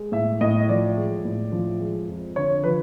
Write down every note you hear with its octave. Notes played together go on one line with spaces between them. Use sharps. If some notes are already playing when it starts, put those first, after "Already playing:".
Already playing: G#3
A2 E5
A2 D#5
F3 D5
G#3
A2
F3
G#3
F2
D3 C#5
F3 B4